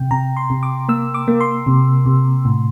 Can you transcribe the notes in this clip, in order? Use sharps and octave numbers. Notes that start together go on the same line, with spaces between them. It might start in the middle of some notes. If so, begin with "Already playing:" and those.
Already playing: C3 G5
C3 A#5
C6
C3
D6
A#3 E6
D6
A#3
C6
C3
C3
A2